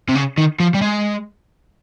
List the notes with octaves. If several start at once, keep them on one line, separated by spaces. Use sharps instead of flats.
C3
C#3
D#3
F3
G3
G#3